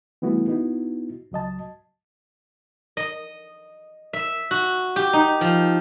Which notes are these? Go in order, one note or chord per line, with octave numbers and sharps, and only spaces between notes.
E3 G3 A3 B3 E4 F#4
B3 D#4 E4 F#4
C#2 F#3 D#5 A5
D#5
E5
F#4
G4
D#4
F3